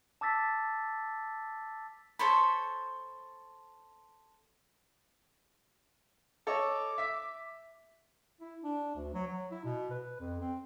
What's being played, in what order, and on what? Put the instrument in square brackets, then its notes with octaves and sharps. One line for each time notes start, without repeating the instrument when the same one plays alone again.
[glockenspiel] A5 D6 E6 A6 B6
[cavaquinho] A4 C5 C#5 B5
[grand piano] A4 C#5 D#5 [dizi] D6
[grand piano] E5 B6
[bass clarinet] E4
D4
D2
F#3
F#3
E4
B2
B4
F2
C4